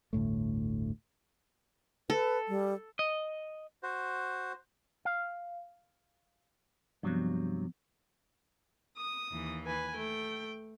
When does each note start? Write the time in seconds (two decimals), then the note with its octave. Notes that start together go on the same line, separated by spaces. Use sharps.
0.13 G1 D2 A2 A3
2.10 A4 B4
2.48 G3
2.99 D#5
3.83 F#4 C5
5.05 F5
7.03 G2 C3 F3 F#3 B3 F#6
8.97 D#6
9.32 D#2 E3
9.65 B4 G#5
9.96 A3 G5